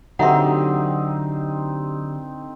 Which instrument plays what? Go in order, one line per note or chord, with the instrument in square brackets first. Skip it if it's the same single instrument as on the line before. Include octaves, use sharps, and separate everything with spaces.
[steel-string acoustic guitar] D3 [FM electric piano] F#3 G4 [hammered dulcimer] C4 D#4 [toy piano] E5 F#5